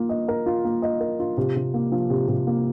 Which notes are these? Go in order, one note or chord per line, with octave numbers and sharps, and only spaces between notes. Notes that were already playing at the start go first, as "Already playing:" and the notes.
Already playing: A#3 F4
D#5
A#4
F4
A#3
D#5
A#4
F4
C3
C3
A#3
F3
C3
C3
A#3